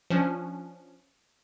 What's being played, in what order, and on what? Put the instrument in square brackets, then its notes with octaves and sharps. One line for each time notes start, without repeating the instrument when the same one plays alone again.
[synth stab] F3 C#4 D4